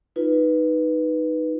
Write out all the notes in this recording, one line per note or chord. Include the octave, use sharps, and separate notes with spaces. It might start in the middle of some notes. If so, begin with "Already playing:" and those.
D#4 F4 B4